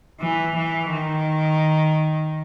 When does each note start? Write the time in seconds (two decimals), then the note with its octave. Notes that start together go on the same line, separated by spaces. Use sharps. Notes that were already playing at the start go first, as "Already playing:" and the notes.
0.20 E3
0.56 E3
0.92 D#3